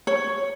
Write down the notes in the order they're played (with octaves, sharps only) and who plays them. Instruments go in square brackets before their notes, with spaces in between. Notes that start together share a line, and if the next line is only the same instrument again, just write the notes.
[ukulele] C#5